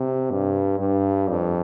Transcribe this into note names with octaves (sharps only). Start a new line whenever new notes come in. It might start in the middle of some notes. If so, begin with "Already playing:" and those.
Already playing: C3
G2
G2
F2